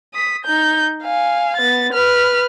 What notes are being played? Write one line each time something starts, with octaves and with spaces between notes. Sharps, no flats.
D#6 B6
D#4 G6
F5 G#5
B3 A6
B4 F6